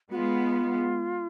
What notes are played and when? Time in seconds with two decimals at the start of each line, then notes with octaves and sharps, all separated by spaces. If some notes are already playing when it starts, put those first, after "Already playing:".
0.11 G#3 B3 F4 F#4